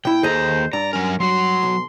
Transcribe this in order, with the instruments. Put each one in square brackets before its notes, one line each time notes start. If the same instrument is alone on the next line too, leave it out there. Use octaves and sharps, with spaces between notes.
[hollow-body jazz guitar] A#2 E4 [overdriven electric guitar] G5
[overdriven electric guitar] D#2 A#5 [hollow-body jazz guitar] G#4 A4 D#5 [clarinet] C5
[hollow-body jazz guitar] G2 [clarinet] D5 [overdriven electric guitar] A#5
[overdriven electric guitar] F#3 A#4 [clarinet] C#4
[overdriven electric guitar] F#3 F#4 [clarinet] C6
[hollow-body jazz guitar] B1